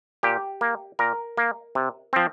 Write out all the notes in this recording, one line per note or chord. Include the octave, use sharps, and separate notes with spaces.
A#2 G4
A#3
A#2 A#4
A#3
C3
F3 C4